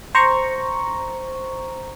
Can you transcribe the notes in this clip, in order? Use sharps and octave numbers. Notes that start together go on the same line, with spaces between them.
C5 A#5 C#6